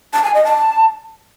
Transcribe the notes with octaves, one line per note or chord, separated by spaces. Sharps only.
A5
G#5
D#5
A5